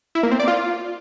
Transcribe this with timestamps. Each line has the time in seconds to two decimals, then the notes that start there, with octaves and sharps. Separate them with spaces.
0.15 E4
0.23 A#3
0.31 C4
0.40 D5
0.48 F4